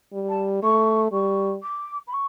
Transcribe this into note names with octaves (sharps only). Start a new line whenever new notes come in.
G3
A5
A3 C#6
G3 C#6
D6
B5
C#6